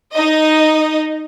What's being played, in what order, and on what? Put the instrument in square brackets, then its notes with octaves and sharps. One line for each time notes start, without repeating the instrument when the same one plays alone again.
[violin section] D#4 D#5